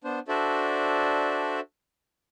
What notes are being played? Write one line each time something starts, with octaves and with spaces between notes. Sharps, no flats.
B3 D4 C5
D4 F#4 A4 C5 D5 E5